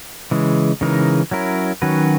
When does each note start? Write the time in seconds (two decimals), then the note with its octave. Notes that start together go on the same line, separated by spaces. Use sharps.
0.31 C#3 E3 G#3
0.81 C#3 E3 G#3 D#4 A#4
1.31 F#3 C#4 E4 A#4
1.82 D#3 F#3 C#4 F#4 B4